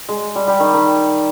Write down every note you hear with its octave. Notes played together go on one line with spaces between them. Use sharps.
G#3
G3
G3
D#3
D#3